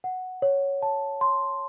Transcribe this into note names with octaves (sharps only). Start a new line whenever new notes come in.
F#5
C#5
A5
C6